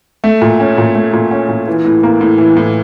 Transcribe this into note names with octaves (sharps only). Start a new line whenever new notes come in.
A3
A#2
C#4
A#2
A3
A#2
C#4
A#2
E3
A2
A#3
A2
E3
A2